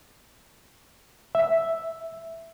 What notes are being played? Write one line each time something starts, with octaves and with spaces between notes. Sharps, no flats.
E5